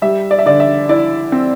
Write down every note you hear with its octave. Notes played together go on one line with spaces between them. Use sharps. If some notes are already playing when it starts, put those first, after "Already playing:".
G3 E5
D5
E5
D3 D5
E5
E4 D5
C4